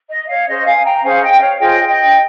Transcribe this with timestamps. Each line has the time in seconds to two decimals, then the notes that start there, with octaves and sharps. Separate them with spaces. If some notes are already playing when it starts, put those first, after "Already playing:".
0.09 D#5
0.28 C#5 F5
0.47 C#4 G#4 C5 D#5
0.65 F5 G#5
0.84 G5 A#5
1.02 C#4 G#4 C5 F5 G#5
1.21 D#5 G5
1.40 C#5 F5
1.58 F4 G#4 C5 D#5 G5
1.87 D#5 G5